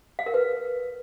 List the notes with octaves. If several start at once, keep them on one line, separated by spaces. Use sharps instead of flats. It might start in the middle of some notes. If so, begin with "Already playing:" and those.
F5
A#4
B4